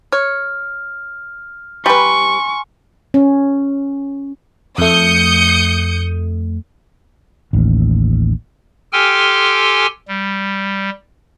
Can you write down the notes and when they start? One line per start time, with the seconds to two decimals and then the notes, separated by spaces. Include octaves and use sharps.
0.12 C#5 F6
1.86 G3 B4 G#5 C6 C#6
3.14 C#4
4.78 F2 A3 D#6 G6 C#7
7.53 A1 D#2
8.93 G4 A4 G5 G#5 C6 F6
10.08 G3